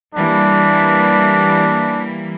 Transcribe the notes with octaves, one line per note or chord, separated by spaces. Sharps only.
E3 G3 A#3 D4